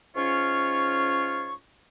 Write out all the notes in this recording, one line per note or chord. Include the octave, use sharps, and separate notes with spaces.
G#2 C#4 F4 C#5 C#6